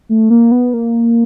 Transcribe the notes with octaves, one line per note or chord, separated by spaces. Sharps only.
A3
A#3
B3
A#3